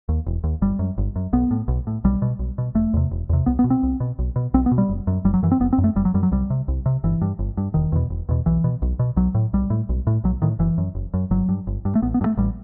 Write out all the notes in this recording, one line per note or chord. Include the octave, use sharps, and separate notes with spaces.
D#2
E1
D#2
G1 G3
F#2
G1
F#2
B1 B3
A2
B1
A2
B1 G3
B2
B1
B2
E1 A3
E2 C3
E1
E2 C3
C2 B3
B3
B2
C4
C2
B2
B1
B2
B1 C4
B3
B2
G3
F#1
F#2
F#1 G3
F#3
F#2 E3
C4
F#1 B3
C4
F#2
A3
F#1 G3
F#3
F#2 G3
F#3
C2 G3
C3
C2
C3
G1 E3
G2
G1
G2
E1 D#3
E2 B2
E1
E2 B2
B1 E3
B2
B1
B2
B1 F#3
A2
B1 G3
A2
B1
A2
B1 F#3
A2 D#3
F#1 E3
F#2
F#1
F#2
G1 F#3
G2
G1
G2
A3
A1 B3
B3
G2
A3
A1 G3